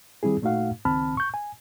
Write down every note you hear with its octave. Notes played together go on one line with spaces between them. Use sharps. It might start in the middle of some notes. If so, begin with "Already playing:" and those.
D#3 G3 C4 E4 G#4
A#2 A3 D#4 F#4 F5 F#5
C#2 D#3 C4 A5 B5 F6
C#6 G6
G#5